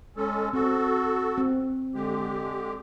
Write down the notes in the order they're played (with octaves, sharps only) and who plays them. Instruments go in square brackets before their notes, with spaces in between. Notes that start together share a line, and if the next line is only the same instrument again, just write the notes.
[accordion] G#3 C#4 A4
[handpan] C4 [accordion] F#4 A4
[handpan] C4
[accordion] D3 G#3 G4